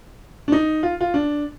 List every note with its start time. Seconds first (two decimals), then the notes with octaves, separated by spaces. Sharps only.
0.48 D4
0.52 D#4
0.83 F4
1.01 F4
1.14 D4